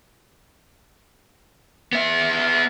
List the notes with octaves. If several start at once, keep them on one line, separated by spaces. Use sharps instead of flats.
B3 E5